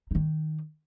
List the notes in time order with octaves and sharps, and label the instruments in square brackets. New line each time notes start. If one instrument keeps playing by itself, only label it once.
[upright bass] D#3 D#4